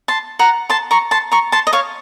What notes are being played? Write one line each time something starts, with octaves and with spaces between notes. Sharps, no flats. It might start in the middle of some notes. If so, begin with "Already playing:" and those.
A5 C6
F#5 A#5
A5 C6
A#5 C#6
A5 C6
A#5 C#6
A5 C6
D#5
C#5 F5